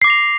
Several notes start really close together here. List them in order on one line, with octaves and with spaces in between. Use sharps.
C7 D6 A#6 F7